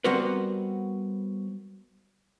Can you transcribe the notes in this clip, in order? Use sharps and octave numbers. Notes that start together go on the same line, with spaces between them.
G3 B3 C4 F#4 A#4 B4